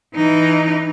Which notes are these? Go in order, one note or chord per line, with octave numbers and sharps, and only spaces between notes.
E3 D#4